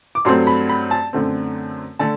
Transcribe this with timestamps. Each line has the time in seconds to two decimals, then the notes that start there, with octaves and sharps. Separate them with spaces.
0.15 D6
0.25 G2 F#3 A3 C4 C6
0.47 B5
0.69 B5
0.91 A5
1.13 F#2 D3 A3 C4
1.99 D3 A3 A5